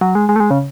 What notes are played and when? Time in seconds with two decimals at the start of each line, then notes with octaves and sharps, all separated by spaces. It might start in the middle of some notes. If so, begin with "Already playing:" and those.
0.01 F#3
0.15 G#3
0.29 G#3
0.36 A3
0.40 G#3
0.51 C#3